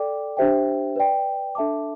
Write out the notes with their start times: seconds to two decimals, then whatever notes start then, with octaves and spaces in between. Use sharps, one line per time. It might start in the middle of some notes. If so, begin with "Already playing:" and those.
Already playing: A4 D5 G5 D6
0.37 D4 G4 C5 E5 G5
0.96 B4 D5 G5
1.55 D4 A4 E5 A5 D6